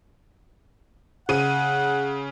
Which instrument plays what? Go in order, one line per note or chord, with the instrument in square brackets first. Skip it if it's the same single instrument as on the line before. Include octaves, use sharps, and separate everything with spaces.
[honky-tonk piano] C#3 D#7 [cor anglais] F#5